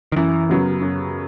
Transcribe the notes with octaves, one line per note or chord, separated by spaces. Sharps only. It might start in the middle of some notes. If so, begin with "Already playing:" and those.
D#3
F#2 E3
C#3 F#3 B3
F#2